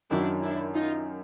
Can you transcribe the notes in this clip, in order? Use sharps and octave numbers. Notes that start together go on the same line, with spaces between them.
F#2 D#3 F#3 D4 E4
D4 E4
D#4 F4